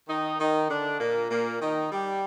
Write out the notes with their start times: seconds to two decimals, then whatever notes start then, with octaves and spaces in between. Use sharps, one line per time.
0.09 D#3 D#4
0.40 D#3 D#4
0.70 D3 D4
1.00 A#2 A#3
1.31 A#2 A#3
1.61 D#3 D#4
1.92 G3 G4